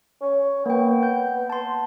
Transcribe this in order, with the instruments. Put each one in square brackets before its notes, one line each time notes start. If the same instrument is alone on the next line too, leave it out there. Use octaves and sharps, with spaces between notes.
[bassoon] C#4
[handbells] A#3 G5 [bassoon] B3
[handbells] G6
A5 C6